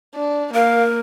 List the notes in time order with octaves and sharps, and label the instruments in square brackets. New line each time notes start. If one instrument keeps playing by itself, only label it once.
[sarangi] D4
[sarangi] A#3 [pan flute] A#4 [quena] F5